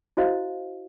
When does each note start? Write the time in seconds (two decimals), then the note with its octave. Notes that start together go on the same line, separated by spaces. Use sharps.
0.17 E4 F#4 C5 D#5 F5